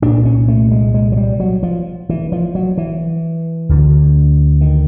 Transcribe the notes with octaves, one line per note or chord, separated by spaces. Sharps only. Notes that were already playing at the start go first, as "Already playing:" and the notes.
C2 A#2 D4
C#4
A3
G#3
G#3
F#3
G3
F#3
F3
E3
F3
F#3
E3
D2 D3
D#3